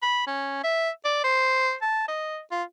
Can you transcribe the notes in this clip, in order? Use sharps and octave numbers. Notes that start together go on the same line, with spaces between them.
B5
C#4
E5
D5
C5
A5
D#5
F4